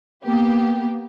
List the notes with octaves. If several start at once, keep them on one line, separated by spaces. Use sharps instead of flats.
A#3 B3 G4